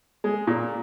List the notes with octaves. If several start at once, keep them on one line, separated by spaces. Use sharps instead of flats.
G#3
A#2